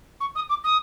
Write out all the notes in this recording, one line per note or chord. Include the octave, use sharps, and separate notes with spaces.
C#6
D#6
D6
D#6